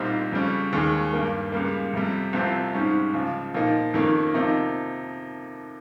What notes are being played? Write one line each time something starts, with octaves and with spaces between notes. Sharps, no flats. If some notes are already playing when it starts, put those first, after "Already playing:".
Already playing: C2 A#2 G3 C4 D#4
F2 C#3 G3 C#4
D#2 D#3 G#3
G2 G3 A#3
C#2 C#3 G3 A#3
F2 C3 G3
C2 C3 F3 C4
G#2 G3 C#4
C#2 C#3 F3
A#2 F3 A#3 D#4
F2 D#3 A#3 C#4
C3 F3 A#3 D#4